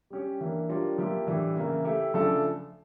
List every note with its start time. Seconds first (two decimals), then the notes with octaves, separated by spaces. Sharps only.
0.10 G3 C#4 G4 C#5
0.40 E3 A#3 D4
0.69 G3 D4 F4 A#4 C#5
0.98 F3 A#3 E4 G4
1.27 A2 E3 G3 D4
1.55 C#3 E3 A#3 E4
1.84 A3 E4 G4
2.14 C#3 F3 A3 D4 A4